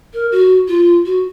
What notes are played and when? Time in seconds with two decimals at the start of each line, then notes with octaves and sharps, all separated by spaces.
0.13 A#4
0.32 F#4
0.68 F4
1.05 F#4